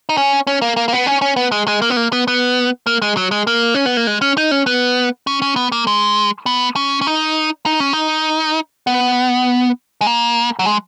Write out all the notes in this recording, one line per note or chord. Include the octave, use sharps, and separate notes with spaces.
D#4
C#4
C#4
A#3
A#3
A#3
B3
C#4
C#4
B3
G#3
G#3
A#3
B3
A#3
B3
B3
A#3
G#3
F#3
G#3
A#3
C#4
B3
A#3
G#3
C#4
D#4
C#4
B3
C#4
C#4
B3
A#3
G#3
B3
C#4
C#4
D#4
D#4
C#4
D#4
B3
G#3
A#3
F#3
G#3